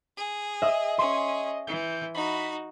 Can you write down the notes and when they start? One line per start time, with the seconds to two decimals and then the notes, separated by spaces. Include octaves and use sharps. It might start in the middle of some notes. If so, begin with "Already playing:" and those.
0.17 G#4
0.62 D#5 E5 D#6
0.98 C#4 G#4 C6
1.67 E3 G6
2.15 D#4 F#4 B5